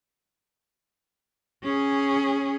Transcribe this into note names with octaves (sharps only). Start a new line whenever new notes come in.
C#4 G#4